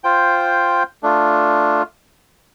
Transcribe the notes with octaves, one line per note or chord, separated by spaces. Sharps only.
F4 C5 G5
A3 D4 F4